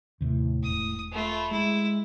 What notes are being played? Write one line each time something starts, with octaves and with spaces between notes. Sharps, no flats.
D#2 A2 C3
E1 D#6
A3 F4 B5
G#3 E4